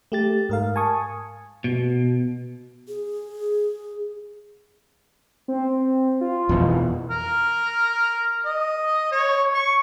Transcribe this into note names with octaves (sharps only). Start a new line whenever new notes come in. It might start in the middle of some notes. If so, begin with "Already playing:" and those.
A3 G4 A6
G#2 A#4 F5
G#5 A5 C#6 D#6
B2
G#4
C4
F4
F2 B2 E3
A#4
D#5
C#5
C#6